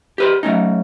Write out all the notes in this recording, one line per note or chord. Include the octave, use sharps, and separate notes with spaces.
G4 B4 C5
F#3 A3 C#4 D#4